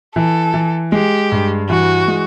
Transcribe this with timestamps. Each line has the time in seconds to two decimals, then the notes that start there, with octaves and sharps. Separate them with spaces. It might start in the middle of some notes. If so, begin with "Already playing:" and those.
0.16 E3 A4
0.54 E3
0.92 G#3 G4
1.32 G2
1.69 E3 F#4
2.08 G#3